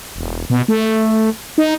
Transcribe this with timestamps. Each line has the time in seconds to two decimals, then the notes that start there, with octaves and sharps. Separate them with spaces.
0.16 E1
0.50 B2
0.68 A3
1.58 D#4